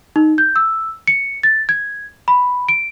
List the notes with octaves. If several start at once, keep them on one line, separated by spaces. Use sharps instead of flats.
D#4
G6
E6
C#7
A6
G#6
B5
D7